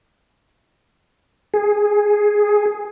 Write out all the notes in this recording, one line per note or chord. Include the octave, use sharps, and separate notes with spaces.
G#4